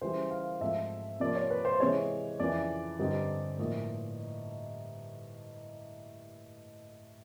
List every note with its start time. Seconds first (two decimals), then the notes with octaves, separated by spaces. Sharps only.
0.01 C#3 E3 G3 C5
0.31 F5
0.60 G#2 F3 A3 C4 E5
1.20 C3 F3 A#3 D5
1.35 C#5
1.50 B4
1.65 C5
1.80 C3 E3 G#3 C#5
2.40 F2 C#3 E3 D5
2.99 G2 D3 G3 C4 D#4
3.58 A2 F3 A#3 D#4 D#5